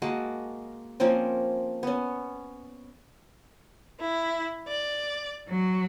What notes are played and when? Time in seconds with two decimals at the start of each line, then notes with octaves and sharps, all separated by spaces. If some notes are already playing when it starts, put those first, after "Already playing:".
0.02 G#3 A#3 F#4 A5
1.00 F3 A#3 C4 C#4
1.83 B3 C#4
4.01 E4
4.67 D5
5.48 F#3